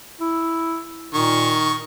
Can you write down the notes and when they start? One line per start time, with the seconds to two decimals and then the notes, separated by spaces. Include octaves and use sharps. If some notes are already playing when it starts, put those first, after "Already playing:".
0.21 E4
1.14 A#2 D#3 C#6